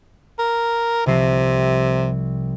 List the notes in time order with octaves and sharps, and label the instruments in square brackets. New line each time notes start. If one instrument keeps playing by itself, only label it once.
[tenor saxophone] A#4
[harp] C2 F3 C6 [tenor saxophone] C3